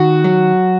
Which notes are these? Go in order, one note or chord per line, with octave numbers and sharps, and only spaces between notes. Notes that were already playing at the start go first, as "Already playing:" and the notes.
Already playing: D#3 F#4
F#3